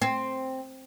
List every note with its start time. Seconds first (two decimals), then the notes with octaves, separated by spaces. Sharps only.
0.02 C4